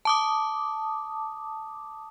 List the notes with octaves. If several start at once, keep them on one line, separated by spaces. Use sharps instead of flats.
A5 D6 D#6